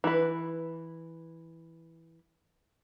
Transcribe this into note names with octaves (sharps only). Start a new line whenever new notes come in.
E3 B4